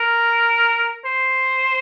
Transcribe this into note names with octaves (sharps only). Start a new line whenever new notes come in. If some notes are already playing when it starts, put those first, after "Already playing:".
Already playing: A#4
C5